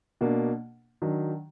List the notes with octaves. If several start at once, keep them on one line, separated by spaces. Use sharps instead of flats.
B2 A#3 D4
D#3 F#3 D4